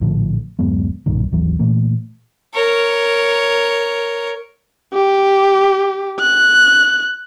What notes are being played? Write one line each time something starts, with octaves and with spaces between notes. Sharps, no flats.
A#1 A2 D3 F3
D1 F#2 G#3 B3
B1 G2 A#2 D#3
G#1 D#2 E3 F#3
A#2 E3 A3 A#3
A#4 C#5
G4
F#6